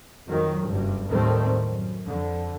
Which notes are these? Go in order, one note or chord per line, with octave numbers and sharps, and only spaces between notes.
F2 D#3 F#3
F#1 G2
D#2 A2 D#3 G3 A3 C4
F#2
F2 D3